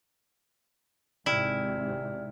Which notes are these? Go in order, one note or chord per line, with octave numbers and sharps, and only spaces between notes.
G#1 G#2 C3 E4 D5 G5 F6